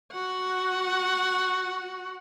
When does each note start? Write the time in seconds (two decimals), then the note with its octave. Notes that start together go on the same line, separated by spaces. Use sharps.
0.12 F#4 F#5